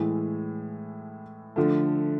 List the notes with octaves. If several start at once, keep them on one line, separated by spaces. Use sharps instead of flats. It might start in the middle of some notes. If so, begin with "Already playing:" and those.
Already playing: A2 E3 G#3
D3 F3 A3